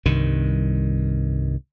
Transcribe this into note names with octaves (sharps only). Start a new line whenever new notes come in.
C2 G2 D#3